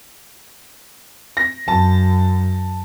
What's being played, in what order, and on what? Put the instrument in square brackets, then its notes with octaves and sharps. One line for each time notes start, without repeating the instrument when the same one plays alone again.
[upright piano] A#6
[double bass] F#2 [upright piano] A5